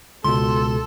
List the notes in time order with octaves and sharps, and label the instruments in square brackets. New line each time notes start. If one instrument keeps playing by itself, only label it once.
[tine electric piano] C#2 B2 [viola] A4 [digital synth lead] C6